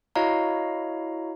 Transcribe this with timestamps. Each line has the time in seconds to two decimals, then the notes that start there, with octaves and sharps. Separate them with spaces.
0.15 E4 F#4 C#5 D#5 F5 A#5